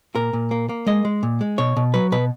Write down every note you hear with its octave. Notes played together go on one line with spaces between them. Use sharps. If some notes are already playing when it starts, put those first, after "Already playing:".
A#2 A#4
A#2
A#3
A#3
G#3 D#5
G#3
A#2
G#3
B2 C#5
B2
F#3 B4
B2 B4